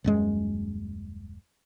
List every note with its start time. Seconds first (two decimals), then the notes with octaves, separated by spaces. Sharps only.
0.04 D#1 F#2 G#3